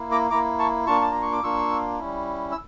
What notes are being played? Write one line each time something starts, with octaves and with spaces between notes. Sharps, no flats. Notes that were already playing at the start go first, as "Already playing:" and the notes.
Already playing: A#3 E4
A#5 D6
A#3 E4 A#5 D6
A5 C#6
A#3 D4 F4 A5 C#6
A5
A#5
C#6
D6
A#3 D4 F4 C#6 E6
G3 C#4 E4
E6